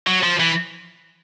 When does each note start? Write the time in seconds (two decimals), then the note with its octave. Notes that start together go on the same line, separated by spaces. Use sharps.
0.07 F#3
0.23 F3
0.40 E3